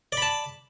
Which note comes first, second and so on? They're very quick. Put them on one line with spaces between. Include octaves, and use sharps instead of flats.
D5 B5 A5